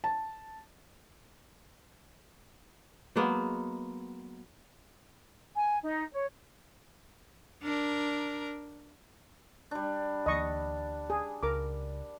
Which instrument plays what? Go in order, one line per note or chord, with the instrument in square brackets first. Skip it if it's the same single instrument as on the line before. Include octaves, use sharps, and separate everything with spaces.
[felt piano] A5
[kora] F#3 G#3 A#3 B3
[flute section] G#5
D#4
C#5
[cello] D4 A#4
[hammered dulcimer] G3 D4
[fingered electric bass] D2 E3 A#3 [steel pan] D#5 C#6
[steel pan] G#4
[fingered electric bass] C#2 [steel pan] A#4 D6